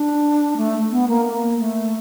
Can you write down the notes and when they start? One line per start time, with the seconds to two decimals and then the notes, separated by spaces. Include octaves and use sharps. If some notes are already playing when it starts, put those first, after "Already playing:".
Already playing: D4
0.57 A3
0.91 B3
1.08 A#3
1.25 A#3
1.59 A3